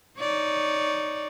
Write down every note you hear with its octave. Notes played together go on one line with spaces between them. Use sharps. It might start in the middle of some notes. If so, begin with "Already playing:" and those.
D#4 C#5 D5